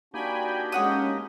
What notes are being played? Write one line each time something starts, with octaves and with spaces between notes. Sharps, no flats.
A#3 D4 D#4 F#4 G4 G5 G#5 B5
G#3 C#4 C#5 F#5 D#6